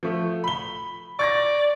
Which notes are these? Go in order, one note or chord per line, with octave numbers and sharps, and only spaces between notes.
F3 A3
B5 G7
D5 C#6 A6 A#6